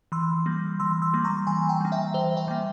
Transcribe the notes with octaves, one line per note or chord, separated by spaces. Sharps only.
E3 C6 E6
G3 A#3
E3 C6 E6
C6 E6
G3 A#3
A#5 C#6
E3 G#5 C6
G5 A#5
G3 A#3
E5 G5
E3 C5 E5
E5 G5
G3 A#3